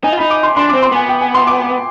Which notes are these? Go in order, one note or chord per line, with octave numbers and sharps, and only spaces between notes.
D#4 G#5
F4
D#4 B5
D6
C6
D4 C6
C4 D6
C6
B3 G#5
G5
G#5
C6
D6